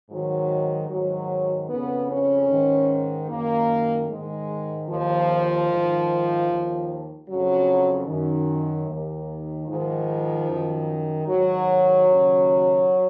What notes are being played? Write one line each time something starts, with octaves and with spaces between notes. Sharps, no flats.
G#2 D#3 F#3
G#2 D#3 F#3
F2 C#3 B3
C#4
G#2 D#3
F#2 D#3 A#3
G#2 D#3 G#3
D#2 D#3 F3
G#2 D#3
D#2 D#3
F2 C#3 F#3
F#2 D#3
D#2 D#3
G#2 D#3 F3
F#2 D#3
G#2 D#3 F#3
D#2 C#3